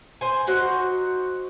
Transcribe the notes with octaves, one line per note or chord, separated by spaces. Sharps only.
C5 G#5
D#4 F#4 C5